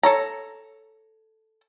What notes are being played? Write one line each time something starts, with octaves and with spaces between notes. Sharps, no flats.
A4 C#5 A#5